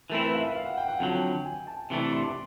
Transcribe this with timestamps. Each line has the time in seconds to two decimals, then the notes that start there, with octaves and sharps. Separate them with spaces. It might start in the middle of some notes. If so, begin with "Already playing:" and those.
0.10 E3 A3 C4 E4 A#4
0.25 B4
0.34 F5
0.40 E5
0.55 F5
0.66 F#5
0.77 G5
0.88 F#5
1.00 F2 D3 F#3 G5
1.45 G#5
1.67 A5
1.90 C3 E3 A3 D4
2.13 C6
2.23 D6